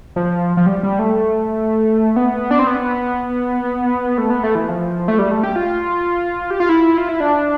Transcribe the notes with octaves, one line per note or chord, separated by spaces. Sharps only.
F3
F3
G3
G3
A3
B3
D4
C4
B3
A3
B3
A3
E3
F3
A3
G3
A3
G4
F4
G4
F4
E4
F4
E4
D4